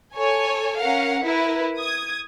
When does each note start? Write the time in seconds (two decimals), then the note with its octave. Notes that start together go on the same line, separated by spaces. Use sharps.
0.16 A4 C#5 G#5
0.81 C#4 A#4 F5 F#5
1.23 E4 A#4 B4
1.78 D#6 G#6